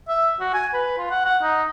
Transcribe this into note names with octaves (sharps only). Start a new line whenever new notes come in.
E5
F#4
G#5
B4
F4
F#5
F#5
D#4